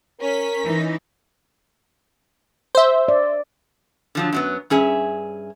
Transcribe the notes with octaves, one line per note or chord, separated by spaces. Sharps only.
C#4 A#4 B6
E3 D#4
C5 E5
D5
D3 F3 F#3
F#2 F#3 B3
G2 C#4 G#4 E5